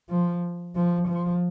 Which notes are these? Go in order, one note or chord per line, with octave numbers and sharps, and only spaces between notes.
F3
F3
F3